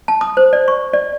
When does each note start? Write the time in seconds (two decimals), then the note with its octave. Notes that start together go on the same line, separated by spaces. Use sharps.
0.08 A5
0.21 D#6
0.37 C5
0.53 D5
0.68 C#6
0.93 D5